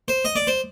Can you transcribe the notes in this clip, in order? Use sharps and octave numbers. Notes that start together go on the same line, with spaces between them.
C5
D#5
D5
C5